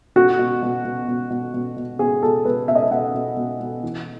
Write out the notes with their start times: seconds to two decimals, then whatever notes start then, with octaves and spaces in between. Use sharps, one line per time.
0.16 B2 F#4
0.39 B2
0.62 B2
0.85 B2
1.08 B2
1.30 B2
1.54 B2
1.76 B2
1.99 B2 G#4
2.23 B2 A4
2.45 B2 B4
2.68 B2 E5
2.75 D#5
2.82 E5
2.91 B2 F#5
3.14 B2
3.37 B2
3.60 B2
3.83 E3